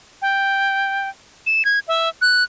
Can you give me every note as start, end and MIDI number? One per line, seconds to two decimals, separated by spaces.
0.22 1.09 79
1.46 1.65 100
1.65 1.79 92
1.88 2.09 76
2.22 2.44 90